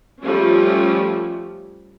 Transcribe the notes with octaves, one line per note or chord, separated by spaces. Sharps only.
F3 G3 A3 C#4